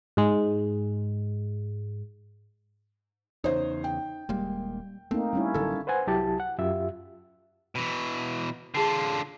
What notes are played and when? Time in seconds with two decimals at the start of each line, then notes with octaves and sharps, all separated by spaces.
0.17 G#2 G#3
3.44 E2 C#3 D#4 C5 C#5
3.84 G5
4.29 D#1 G3 G#3 A#3
5.11 A3 A#3 C4 D#4
5.33 G3 C#4 E4
5.54 A1 D3 F#3 A4
5.87 B4 C5 F#5 G#5
6.07 C2 F#3 E4 G4 A5
6.40 F#5
6.58 F#2 F4 G4 E5
7.75 B2 E3
8.75 D3 F4 G#4 A5 C7